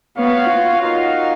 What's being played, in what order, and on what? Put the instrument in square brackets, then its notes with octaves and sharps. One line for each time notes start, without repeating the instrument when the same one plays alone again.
[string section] B3 [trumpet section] F#4 C#5 F5
[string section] F4
[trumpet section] D#4 F#4 A#4 F5